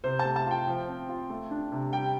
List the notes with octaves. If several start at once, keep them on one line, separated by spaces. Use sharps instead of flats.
C3 C5
A5
A3
A5
F4 G5
F3
C4
F4
A3
D4
C3
G3 G5